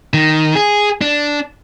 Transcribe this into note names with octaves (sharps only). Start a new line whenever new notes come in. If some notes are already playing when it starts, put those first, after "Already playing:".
D#3
G#4
D4